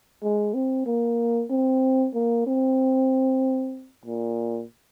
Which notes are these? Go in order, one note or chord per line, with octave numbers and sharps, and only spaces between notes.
G#3
C4
A#3
C4
A#3
C4
A#2